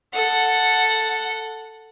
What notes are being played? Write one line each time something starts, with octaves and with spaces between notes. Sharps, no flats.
A4 F#5